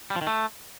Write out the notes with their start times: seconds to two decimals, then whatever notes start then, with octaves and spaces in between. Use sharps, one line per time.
0.10 G3
0.16 F3
0.21 D#3
0.27 A3